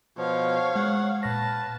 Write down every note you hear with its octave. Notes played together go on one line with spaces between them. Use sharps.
B2 F3 C#5 F5
G#3 F#5
A#2 B4 A5 F6 A#6